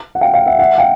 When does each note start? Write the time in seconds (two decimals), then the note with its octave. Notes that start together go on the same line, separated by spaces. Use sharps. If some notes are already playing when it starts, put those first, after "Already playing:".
0.15 F#5
0.21 F5 G5
0.34 F5 G5
0.46 E5 F#5
0.59 E5 F#5
0.78 F5 G5